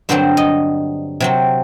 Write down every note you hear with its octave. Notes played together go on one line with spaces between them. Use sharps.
G2 D3 F#3 C4 C5
D#5
C3 F#3 C4